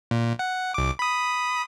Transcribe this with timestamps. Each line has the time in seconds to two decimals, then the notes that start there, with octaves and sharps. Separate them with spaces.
0.11 A#2
0.39 F#5
0.74 C2 D6
0.99 B5 D#6